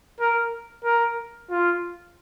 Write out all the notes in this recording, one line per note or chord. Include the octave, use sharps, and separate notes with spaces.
A#4
A#4
F4